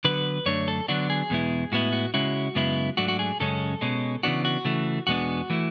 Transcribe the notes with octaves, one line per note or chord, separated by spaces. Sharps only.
D3 F#3 B3 B4
F#2 D3 A3 D4 C#5
A4
D3 F#3 B3 D4 F#4
G#4
E2 B2 G#3 B3 E4
A2 G#3 B3 E4 F#4
F#4
C#3 G#3 C#4 E4 F#4
F#2 C#3 G#3 B3 E4
G#2 F#3 A3 D4 F#4
F#4
G#4
F#2 C#3 G#3 C#4 A4
B2 G#3 C#4
C#3 E3 B3 D4 F#4
F#4
C#3 E3 A3
E2 B2 G#3 B3 D4 F#4
E3 A3 E4